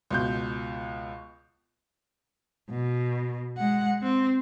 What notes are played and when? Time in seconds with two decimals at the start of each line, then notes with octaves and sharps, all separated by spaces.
0.10 C#2 B2 G6
2.70 B2
3.58 G#3 F#5
4.03 C4